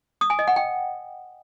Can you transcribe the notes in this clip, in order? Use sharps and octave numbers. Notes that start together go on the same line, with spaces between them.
D#6
G#5
D#5
F#5
G5